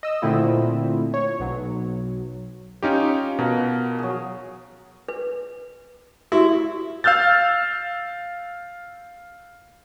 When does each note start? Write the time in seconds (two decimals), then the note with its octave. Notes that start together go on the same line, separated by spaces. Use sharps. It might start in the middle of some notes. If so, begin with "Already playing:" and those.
0.03 D#5 E6
0.22 A#2 D3 A3 C4 E4 F4
1.14 C#5
1.40 B1 F#3
2.83 C#4 D#4 F4 G4
3.39 B2 A#4 F#5
3.99 F#3 G#4
5.08 B4
6.32 E4 F#4 G4
7.04 F5 E6 F6 G6 A6